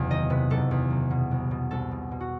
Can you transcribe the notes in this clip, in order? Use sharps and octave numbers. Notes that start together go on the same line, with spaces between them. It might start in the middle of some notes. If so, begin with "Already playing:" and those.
Already playing: F#1 E2 C3
D#3 D#5
C3 B4
F#1 A4
E2
F#1
B2
C2
B2
C2 A4
B2
B2
F#4